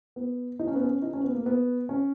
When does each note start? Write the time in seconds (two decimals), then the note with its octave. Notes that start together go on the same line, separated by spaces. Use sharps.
0.16 B3
0.59 D#4
0.68 C#4
0.76 B3
0.84 C#4
1.02 D#4
1.13 C#4
1.24 B3
1.35 A#3
1.46 B3
1.89 C#4